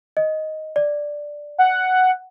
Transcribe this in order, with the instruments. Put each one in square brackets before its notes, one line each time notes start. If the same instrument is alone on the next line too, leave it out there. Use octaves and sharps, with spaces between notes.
[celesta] D#5
D5
[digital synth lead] F#5